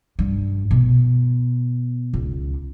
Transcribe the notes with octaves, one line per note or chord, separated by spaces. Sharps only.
G2
B2
C#2